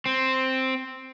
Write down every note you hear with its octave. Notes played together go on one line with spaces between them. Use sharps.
C4